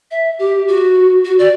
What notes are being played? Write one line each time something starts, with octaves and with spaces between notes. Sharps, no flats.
E5
G4
F#4
F#4
D5